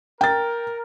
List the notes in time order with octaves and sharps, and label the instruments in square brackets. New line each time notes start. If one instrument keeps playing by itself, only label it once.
[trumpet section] A#4 [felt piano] G5 A6